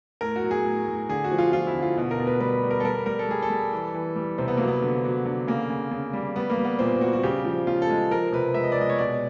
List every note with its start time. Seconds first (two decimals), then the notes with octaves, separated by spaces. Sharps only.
0.21 A2 A#4
0.36 F#4
0.44 F#3
0.51 G#4
0.65 A2
0.88 A2
1.09 D3 G#4
1.24 F#4
1.32 F3
1.38 F4
1.53 F3 F4
1.67 E4
1.75 D3
1.82 F4
1.97 B2
2.11 A#4
2.19 B2
2.27 B4
2.40 G3 B4
2.63 G3
2.71 A#4
2.80 A4
2.84 G3 A#4
3.06 G3 A#4
3.19 A4
3.29 G3 G#4
3.42 A4
3.50 G3
3.73 E3
3.94 E3
4.16 G3
4.38 C3 C4
4.48 B3
4.57 F#3 A#3
4.67 B3
4.82 D3
5.05 F#3
5.26 D3
5.47 C#3 A#3
5.70 C#3
5.91 C#3
6.13 G3
6.36 G3 B3
6.50 A#3
6.58 G3
6.65 B3
6.79 A#2 C4
7.01 G3 F#4
7.13 F#4
7.23 C#3 G4
7.45 F3
7.67 C#3 F4
7.82 A4
7.90 G#3
8.11 F3 A#4
8.32 C3 B4
8.54 G#3 E5
8.64 D#5
8.72 D5
8.77 G#3 D#5
8.89 C#5
8.98 B2 D5